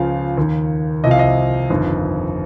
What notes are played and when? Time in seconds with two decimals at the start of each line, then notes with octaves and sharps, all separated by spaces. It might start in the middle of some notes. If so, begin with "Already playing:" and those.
Already playing: C#2 C#3 F3 F5
0.37 D#2 D#3
1.04 C2 C3 F3 D#5
1.11 F5
1.19 D#5
1.69 G1 F2 D#3